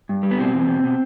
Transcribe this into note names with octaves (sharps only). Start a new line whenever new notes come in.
G2
G3
B3
B2 C4
E2
B2
B2